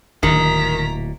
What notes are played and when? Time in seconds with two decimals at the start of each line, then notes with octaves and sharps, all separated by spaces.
0.23 D1 A#2 D#3 A#5 B6